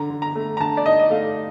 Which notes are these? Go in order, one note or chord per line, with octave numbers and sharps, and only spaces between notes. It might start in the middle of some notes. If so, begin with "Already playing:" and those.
Already playing: D3 A#5
D3
A#5
A3
A#5
D3 A5
D5
D#4 D#5
D#5
A3 F5